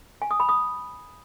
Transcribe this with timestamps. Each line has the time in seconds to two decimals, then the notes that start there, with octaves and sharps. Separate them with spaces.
0.22 G#5
0.31 D#6
0.40 B5
0.49 D#6